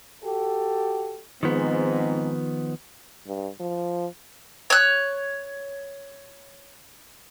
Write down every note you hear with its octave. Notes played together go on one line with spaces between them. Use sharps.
F#4 G4 A4
G#2 D#3 F3 B3 C4
G2
F3
C#5 F#6